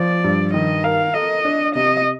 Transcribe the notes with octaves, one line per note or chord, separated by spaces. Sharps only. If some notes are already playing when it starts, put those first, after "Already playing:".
Already playing: F3 D5
G2
D#3 D#5
A#4 F5
A4 D#5
D4
C3 D#5